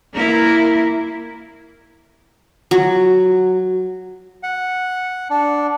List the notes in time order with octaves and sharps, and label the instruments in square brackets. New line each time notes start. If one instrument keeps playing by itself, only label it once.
[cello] A#3 E4
[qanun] F#3
[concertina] F#5
D4